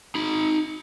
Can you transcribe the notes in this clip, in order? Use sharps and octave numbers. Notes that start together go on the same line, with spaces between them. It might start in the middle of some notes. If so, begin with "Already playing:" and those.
D#4 B5